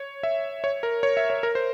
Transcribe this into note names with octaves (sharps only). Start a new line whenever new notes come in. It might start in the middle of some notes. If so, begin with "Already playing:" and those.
Already playing: C#5
E5
C#5
A#4
C#5
E5
C#5
A#4
C5